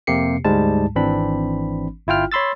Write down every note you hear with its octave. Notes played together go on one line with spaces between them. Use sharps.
F2 C3 A#3 G4 C7 C#7
D2 G#2 G3 G#3 A5
G#1 E3 C4 D4 B5
G1 E4 F4 G5 F6
C#5 B5 C6 E6 A6